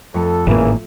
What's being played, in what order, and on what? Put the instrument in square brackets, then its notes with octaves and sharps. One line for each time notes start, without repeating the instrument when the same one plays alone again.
[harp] F2 A3 C#7 [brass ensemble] A4
[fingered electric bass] G#1 A2 A#3 [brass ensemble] C#3 E3 A#4 [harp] E5